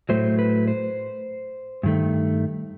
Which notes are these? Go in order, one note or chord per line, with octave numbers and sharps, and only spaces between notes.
A2 F#3 A3 C5
B4
C5
G2 D#3 A3